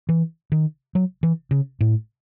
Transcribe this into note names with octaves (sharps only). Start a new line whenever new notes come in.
E3
D#3
F#3
E3
C#3
A2